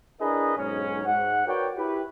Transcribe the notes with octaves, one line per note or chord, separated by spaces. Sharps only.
D4 E4 G#4 A#4 B4 D#5
B1 G#2 C#4
G#2 F#5
F#4 A#4 B4 C#5 D5 G5
E4 G4 B4